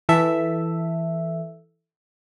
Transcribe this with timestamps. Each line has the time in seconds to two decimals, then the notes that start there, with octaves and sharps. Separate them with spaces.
0.09 E3 A4 E5